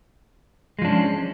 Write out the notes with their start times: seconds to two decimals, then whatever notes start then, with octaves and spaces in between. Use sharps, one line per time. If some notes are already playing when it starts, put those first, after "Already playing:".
0.79 G#3
0.82 F3
0.85 D4
0.88 C#4